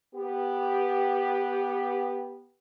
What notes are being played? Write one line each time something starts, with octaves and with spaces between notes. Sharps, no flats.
B3 G4